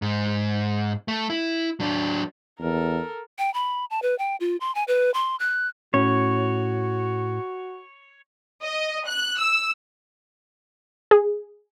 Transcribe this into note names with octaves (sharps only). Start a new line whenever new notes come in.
G#2
A3
E4
F#3 D4
E2 A4 A#4
G5
B5
A5
B4
G5
F4
C6
G#5
B4
C6
F#6
A2 C#4 F#4 C#5
D#5
F#6
E6
G#4